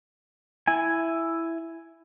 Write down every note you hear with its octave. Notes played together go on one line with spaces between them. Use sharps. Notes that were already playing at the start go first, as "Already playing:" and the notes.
E4 G#5